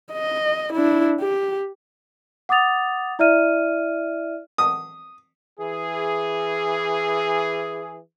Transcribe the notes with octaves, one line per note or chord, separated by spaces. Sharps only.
D#5
D4 E4
G4
F#5 D6 D#6 A6 F7
E4 D5 E5 F6 D#7
D#6
E3 G#4